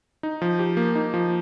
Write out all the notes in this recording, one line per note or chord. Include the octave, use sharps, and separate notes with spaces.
D#4
F3
G4
A#3
D#4
F3